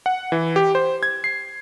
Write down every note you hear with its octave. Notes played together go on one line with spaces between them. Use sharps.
F#5
E3
G4
C5
G#6
C7